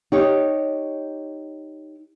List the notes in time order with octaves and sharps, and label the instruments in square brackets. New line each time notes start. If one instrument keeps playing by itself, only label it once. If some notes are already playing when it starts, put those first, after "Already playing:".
[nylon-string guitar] D#4 G4 C#5